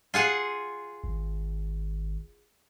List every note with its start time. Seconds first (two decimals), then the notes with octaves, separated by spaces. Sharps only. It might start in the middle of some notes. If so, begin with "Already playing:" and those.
0.14 F4 G#4 F#5
1.04 G#1